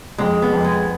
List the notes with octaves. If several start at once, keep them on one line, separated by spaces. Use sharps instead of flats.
F2 G#3
B3
F2
G#3